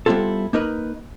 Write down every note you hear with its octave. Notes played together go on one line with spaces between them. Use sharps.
G3 B3 C4 E4 F4 A4
A#3 D#4 A#4 B4